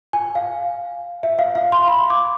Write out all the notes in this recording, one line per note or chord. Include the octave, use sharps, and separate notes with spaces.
G#5
F5
E5
F5
F5
C6
B5
D6